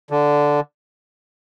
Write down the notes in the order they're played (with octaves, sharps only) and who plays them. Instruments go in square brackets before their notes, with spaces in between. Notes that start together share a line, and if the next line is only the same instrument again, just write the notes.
[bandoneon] D3